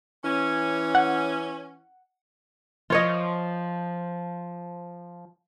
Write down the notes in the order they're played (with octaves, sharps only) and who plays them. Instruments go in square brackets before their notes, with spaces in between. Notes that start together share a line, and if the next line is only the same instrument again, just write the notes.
[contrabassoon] E3 [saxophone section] C#4
[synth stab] F#5
[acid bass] F3 [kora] F4 C#5 D#5